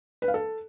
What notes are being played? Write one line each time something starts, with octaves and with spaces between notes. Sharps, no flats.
B4
F5
A4